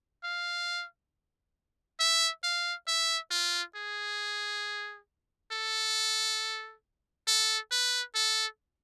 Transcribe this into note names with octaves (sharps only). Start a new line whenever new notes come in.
F5
E5
F5
E5
F4
G#4
A4
A4
B4
A4